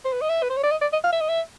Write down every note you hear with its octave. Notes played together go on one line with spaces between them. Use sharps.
C5
B4
D#5
E5
B4
C5
C#5
D5
D#5
D5
D#5
F5
E5
D#5
E5